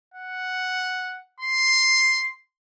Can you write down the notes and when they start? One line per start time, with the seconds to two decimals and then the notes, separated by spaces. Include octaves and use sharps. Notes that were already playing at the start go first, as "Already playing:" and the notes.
0.14 F#5
1.40 C6